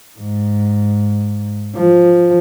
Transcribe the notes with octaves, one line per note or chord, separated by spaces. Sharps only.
G#2
F3